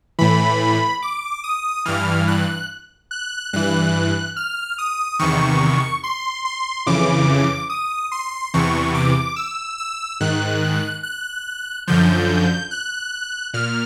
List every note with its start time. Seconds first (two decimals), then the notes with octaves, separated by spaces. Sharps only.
0.19 A2 E3 B5
1.02 D6
1.44 D#6
1.85 G2 E3 F6
2.27 F#6
3.11 F#6
3.53 G2 E3 F#6
4.36 F6
4.78 D#6
5.19 E2 C3 D#3 C#6
6.04 C6
6.45 C6
6.86 F2 C#3 E3 D6
7.70 D#6
8.12 C6
8.54 E2 C3 E3 C#6
8.95 D6
9.36 E6
9.78 E6
10.20 G#2 D#3 F#6
11.03 F#6
11.87 F#2 D3 F3 G6
12.71 F#6
13.54 A#2 F6